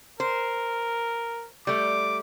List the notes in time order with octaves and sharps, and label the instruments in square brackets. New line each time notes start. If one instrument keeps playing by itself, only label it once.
[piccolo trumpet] A#4 [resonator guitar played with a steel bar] C5
[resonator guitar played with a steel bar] G3 A3 [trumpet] D6